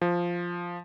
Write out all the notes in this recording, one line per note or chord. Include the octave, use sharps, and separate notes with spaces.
F3